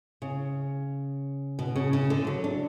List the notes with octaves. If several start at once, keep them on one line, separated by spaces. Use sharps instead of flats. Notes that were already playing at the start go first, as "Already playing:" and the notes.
C#3
B2
C#3
C#3
D3
F#3
D4